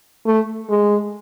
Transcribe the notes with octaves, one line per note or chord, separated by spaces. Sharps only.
A3
G#3